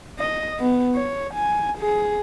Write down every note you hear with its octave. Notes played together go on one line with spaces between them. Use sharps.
D#5
B3
C#5
G#5
G#4